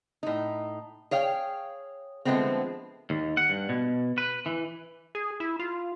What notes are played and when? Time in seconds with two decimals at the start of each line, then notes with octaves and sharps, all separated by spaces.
0.23 A2 D#4
1.11 G#4 C#5 F5 G5
2.25 D3 F3 G#3 A3 B3 C4
3.10 D#2
3.37 F#5
3.50 G2
3.69 B2
4.18 B4
4.46 E3
5.15 G#4
5.40 E4
5.59 F4